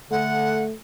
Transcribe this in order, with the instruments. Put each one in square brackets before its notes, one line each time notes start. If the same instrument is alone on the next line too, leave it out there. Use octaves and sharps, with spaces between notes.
[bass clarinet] D3 [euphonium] A3 [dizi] F#5